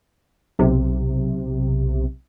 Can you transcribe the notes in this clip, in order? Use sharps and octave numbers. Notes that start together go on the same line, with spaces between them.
B1 C3